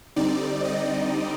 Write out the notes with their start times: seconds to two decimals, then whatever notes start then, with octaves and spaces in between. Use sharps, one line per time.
0.16 D3 G3 C4 D#4 D5
0.65 D#5